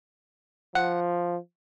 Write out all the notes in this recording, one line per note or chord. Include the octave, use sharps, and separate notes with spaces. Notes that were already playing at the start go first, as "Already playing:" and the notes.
F3 F#5